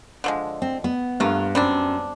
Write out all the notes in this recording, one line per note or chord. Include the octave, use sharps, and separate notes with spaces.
D3 F3 G#3
C4
B3
G2 A3 A#3 F4
F#2 G3 C4 D4